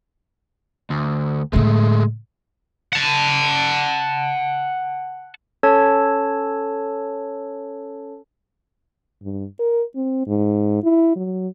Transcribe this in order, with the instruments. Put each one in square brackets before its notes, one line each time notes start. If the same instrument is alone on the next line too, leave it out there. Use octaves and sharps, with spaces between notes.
[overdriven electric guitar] D2
[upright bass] A2 D3 [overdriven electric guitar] G#3 A3
[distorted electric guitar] F#5 A5
[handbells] C#4 A4 C#5 A5
[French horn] G2
A#4
C4
G#2
E4
F#3